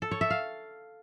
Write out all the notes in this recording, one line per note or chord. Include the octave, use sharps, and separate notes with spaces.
A4
C#5
E5
F5